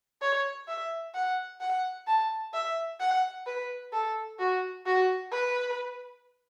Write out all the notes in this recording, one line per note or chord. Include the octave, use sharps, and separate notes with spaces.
C#5
E5
F#5
F#5
A5
E5
F#5
B4
A4
F#4
F#4
B4